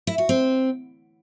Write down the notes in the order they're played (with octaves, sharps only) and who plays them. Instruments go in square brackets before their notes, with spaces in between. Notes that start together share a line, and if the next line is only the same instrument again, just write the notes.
[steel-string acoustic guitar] E4
F#4
C4